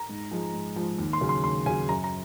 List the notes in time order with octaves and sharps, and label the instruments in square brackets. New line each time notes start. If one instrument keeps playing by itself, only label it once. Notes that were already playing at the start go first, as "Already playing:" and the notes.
Already playing: [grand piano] A#5
G#2
F3 G#3
G#2
F3 G#3
D#2
C6
C#3 F#3
C6
D#2 C6
C#3 F#3 G#5
F#2 A#5
A#5